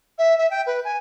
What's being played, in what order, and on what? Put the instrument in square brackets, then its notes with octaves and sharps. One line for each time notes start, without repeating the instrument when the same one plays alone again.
[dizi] E5
E5
G5
B4
G#5